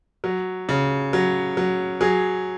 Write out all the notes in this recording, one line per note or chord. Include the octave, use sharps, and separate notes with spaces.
F#3
C#3
F#3
F#3
F#3 G#4